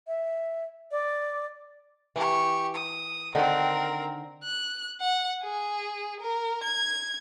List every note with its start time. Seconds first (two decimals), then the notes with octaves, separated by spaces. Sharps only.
0.07 E5
0.91 D5
2.16 E3 G4 C#6
2.75 D#6
3.35 D3 D#3 C4 D#4 A#4
4.44 F#6
5.01 F#5
5.44 G#4
6.20 A#4
6.64 G#6